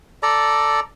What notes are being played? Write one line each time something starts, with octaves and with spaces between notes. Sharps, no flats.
A4 D5 A#5